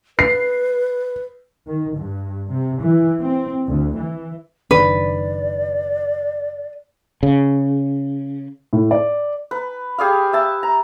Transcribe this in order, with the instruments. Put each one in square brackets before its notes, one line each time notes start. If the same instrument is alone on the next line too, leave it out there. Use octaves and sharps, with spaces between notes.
[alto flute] B4 [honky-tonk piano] C7
[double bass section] D#3
G2
C3
E3
C4
D2
E3
[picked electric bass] F#1 D#3 D4 [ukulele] B4 [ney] D5
[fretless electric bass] C#3
[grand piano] A2
D5
[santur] B4
G4 G#4 D5 F5
E5 A5
A#5